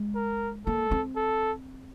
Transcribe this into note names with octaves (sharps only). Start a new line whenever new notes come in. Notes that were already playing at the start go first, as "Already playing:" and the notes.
Already playing: G#3
A#4
A#3 A4
C4
A4